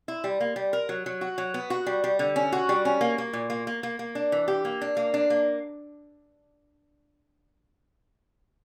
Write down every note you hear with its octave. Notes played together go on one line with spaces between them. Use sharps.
E4
G3
A#3
G3
A#4
F#3
F#3
F#4
F#3
B3
F#4
G3
G3
D3
C#4
F#4
G3
C#4
A#3
A#3
A#2
A#3
A#3
A#3
A#3
D4
E3
G4
A#3
D4
A#3
D4
A#3